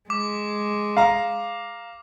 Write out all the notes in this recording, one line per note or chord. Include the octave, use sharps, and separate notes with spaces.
G#3 D6
F5 A#5